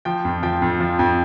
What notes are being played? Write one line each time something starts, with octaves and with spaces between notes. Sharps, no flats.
F3 G5
F2
F3 G5
F2
F3
F2